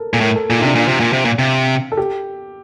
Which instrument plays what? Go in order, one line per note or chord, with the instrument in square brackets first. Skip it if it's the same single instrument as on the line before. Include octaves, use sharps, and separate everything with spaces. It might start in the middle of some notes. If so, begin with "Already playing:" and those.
Already playing: [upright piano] A4 A#4
[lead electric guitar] A#2 [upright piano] A4
[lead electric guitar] A2 [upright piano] A#4
[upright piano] A4
[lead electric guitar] A#2 [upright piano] F4
[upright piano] D#4
[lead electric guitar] C3 [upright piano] D4
[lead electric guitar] A#2 [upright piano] F4
[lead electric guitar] C3
A#2
C3
A#2
C3
[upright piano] A4
G4